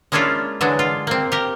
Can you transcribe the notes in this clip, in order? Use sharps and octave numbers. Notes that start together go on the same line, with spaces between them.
G#3 A#3 C#4 D4 E4 F4
D3 E3 F#3 G#3 D4
F4
A#3 C4
G4 A#4